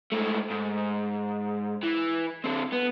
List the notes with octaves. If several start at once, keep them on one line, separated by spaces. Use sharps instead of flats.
G#2 A3
G#2
E3
D3 C4
B3